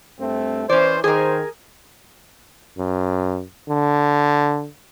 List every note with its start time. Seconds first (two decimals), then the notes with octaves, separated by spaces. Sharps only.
0.20 G2 A3 C4
0.70 E3 C#4 C5 D5
1.04 D#3 G#4 A#4 C5
2.78 F#2
3.69 D3